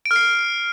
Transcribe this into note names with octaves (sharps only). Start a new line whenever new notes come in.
D7
F6
C7